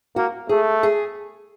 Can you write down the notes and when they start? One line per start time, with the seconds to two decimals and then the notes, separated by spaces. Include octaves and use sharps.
0.16 A#3 F#4
0.49 A3 G#4
0.83 G#4